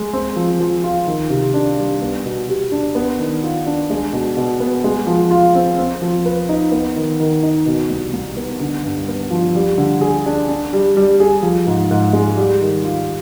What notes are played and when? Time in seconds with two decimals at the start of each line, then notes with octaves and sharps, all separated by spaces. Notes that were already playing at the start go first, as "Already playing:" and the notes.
Already playing: G#3
0.13 C4
0.36 F3
0.60 F3
0.84 F4
1.07 D#3
1.30 C3
1.54 D4
1.78 G3
2.01 B3
2.25 B2
2.49 G4
2.72 D4
2.95 B3
3.19 D#3
3.43 F4
3.66 D4
3.90 G#3
4.13 B2
4.37 B2
4.60 B3
4.84 G#3
5.07 F3
5.31 F4
5.55 C4
5.78 C4
6.02 F3
6.25 B4
6.49 D#4
6.72 B3
6.96 D#3
7.20 D#3
7.43 D#4
7.66 B2
7.90 C2
8.13 C2
8.37 B3
8.60 D3
8.84 G2
9.08 B3
9.31 F3
9.55 G3
9.78 D3
10.01 G#4
10.26 D4
10.49 D4
10.73 G3
10.97 G3
11.20 G#4
11.43 F3
11.67 G#2
11.91 G#2
12.13 G#3
12.37 G3
12.61 D#3
12.84 F4